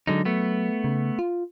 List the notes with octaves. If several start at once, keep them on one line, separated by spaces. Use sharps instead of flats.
D3 F#3 G#3 D#4
A3 B3
C#3
F4